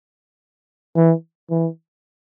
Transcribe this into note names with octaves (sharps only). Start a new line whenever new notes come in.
E3
E3